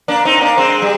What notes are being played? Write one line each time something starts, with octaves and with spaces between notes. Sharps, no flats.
A#3 D4
C4 D#4
A#3 D4
G#3 C4
G3